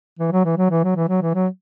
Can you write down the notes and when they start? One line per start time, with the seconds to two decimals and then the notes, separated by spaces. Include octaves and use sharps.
0.19 E3
0.32 F#3
0.45 E3
0.57 F#3
0.71 E3
0.84 F#3
0.96 E3
1.09 F#3
1.22 E3
1.34 F#3